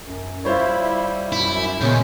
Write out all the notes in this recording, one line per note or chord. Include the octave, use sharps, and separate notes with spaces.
F#2
G3 E4 F4 C5 C#5
F#2 E4
A#2 C#3 G#3 B3 C#4 G6